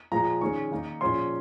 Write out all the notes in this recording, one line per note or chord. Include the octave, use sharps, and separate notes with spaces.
A#2 F3 G#3 A#5
D#3 G#3 C#4 C#6
D#3 A#3 D#4
A#2 F3 G#3 C#4 C6